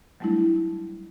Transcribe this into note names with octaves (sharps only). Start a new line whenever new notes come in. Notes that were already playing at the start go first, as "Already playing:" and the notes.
F#3 G3 A3 D4 E4